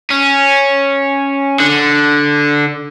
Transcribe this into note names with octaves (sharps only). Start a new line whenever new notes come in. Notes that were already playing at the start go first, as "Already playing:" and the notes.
C#4
D3